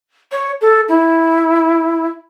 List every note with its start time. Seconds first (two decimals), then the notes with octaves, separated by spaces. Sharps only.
0.32 C#5
0.61 A4
0.88 E4